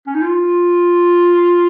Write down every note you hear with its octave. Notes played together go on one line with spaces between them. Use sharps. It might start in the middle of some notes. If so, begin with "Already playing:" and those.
C#4
D#4
F4